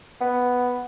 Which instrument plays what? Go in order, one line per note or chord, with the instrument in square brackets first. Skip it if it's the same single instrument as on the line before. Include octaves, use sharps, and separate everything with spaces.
[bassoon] B3